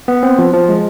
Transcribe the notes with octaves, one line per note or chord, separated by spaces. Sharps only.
B3
C4
F3
F3
G#3